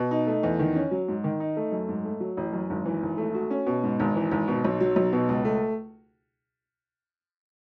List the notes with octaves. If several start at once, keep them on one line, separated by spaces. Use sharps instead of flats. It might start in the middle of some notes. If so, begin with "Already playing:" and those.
Already playing: B2
D#4
A3
E2
D#3
C#4
F#3
G#2
D#3
D#4
A3
F#2
G#2
A3
F#3
A1
F#2
G#1
E3
G#1
A3
F#4
C#4
B2
G#2
G#1
E3
G#1
B2
B1
F#3
B1
B2
C#2
A3